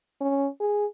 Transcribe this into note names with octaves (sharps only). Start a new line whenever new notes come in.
C#4
G#4